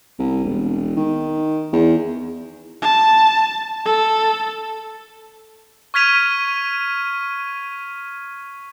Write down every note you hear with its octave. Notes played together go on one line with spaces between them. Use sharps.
C2
E1
D#3
E2
A5
A4
C#6 F6 G#6 B6 D#7 F7